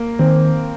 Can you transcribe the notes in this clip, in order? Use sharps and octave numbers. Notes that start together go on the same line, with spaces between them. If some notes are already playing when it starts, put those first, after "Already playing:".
Already playing: A#3
D#3 C4